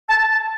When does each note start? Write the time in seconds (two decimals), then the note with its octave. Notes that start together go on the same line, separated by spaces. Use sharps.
0.10 A5